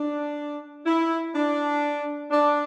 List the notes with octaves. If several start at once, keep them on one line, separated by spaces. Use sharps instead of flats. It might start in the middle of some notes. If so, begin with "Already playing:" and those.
Already playing: D4
E4
D4
D4